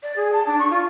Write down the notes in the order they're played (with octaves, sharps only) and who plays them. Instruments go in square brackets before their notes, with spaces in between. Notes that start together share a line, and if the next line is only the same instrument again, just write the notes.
[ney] D5
G#4
A5
D4
C#6
F4